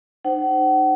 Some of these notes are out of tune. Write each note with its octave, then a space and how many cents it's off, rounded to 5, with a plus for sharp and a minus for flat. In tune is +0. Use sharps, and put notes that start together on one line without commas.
D#4 -35 C5 -5 F#5 +40